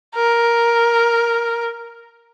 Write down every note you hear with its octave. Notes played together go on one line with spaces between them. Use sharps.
A#4